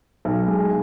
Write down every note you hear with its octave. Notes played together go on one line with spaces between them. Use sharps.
B1
G#3